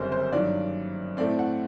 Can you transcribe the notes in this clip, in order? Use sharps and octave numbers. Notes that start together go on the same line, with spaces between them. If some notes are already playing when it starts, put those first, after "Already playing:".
Already playing: F#1 F#2 D3 G3 C4 A#4 C5
C5
G2 D#3 F#3 D5
A2 A3 C4 D5
F#5